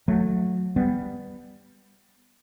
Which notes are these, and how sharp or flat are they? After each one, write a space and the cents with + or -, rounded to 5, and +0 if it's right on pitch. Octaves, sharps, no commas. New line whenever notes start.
F#3 -20 A3 +0
G3 +15 B3 +0